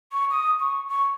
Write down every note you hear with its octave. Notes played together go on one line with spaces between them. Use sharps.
C#6
D#6
C#6
C#6